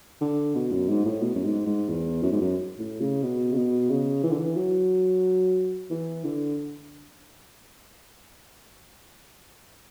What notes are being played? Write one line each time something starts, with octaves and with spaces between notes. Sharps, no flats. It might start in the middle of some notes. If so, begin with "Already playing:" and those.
D3
B2
F#2
G#2
A2
B2
F#2
G#2
G#2
E2
F#2
G#2
F#2
A2
C#3
B2
C#3
B2
C#3
E3
D3
E3
F#3
E3
D3